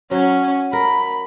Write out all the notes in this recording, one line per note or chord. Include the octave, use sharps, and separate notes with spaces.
F#3 C#4
A#4 B5